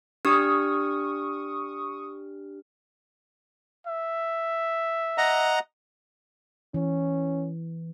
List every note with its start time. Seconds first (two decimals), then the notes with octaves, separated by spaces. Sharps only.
0.25 D4 G4 C#6 D#6 F6
3.87 E5
5.18 D#5 F#5 A#5
6.74 E3 C#4